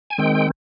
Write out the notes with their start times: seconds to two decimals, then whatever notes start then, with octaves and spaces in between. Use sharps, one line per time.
0.10 G#5
0.18 D#3 G#3 C4 G5